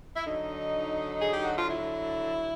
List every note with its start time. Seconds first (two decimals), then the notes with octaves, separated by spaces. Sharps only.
0.15 E4
0.26 D3 F#3 D#4
1.20 G#4
1.32 G4
1.45 F#4
1.57 F4
1.69 E4